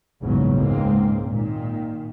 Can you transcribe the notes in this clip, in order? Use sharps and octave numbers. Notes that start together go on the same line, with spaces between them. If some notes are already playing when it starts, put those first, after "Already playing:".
A#1 E2 G#2 C#3 F#3
C#2 G#2 G#3 A#3 C4
A#2 D#3